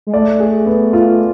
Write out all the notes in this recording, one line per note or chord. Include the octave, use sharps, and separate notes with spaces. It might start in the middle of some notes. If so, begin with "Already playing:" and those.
G#3
A3 D5
G#4
B3
F4